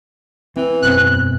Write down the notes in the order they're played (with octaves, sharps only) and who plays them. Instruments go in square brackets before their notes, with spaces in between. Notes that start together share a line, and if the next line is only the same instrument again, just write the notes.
[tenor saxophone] E3 [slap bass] C4
[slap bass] E1 B3 [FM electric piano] F#2 C4 [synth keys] F#6